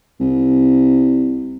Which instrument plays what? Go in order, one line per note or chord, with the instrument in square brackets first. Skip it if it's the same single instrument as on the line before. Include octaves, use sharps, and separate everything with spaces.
[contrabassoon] C2